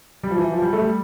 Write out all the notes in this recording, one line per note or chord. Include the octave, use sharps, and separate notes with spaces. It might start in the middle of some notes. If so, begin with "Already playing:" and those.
G3
F3
E3
F3
G3
A3
G3